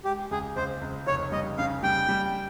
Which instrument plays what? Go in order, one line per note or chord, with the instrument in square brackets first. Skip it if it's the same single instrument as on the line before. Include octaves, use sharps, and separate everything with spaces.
[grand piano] G#3 [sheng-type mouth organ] G4
[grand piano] C#2 [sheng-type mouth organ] G#4
[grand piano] C#2 [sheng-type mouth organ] C5
[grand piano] C#2
[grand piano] F1 [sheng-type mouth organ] C#5
[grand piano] G3 [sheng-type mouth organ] D#5
[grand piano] C#3 [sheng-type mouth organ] F5
[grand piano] G3 [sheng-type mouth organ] G5
[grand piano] G3